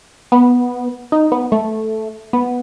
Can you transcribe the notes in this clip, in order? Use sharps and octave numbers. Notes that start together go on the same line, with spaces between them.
B3
D#4
B3
A3
B3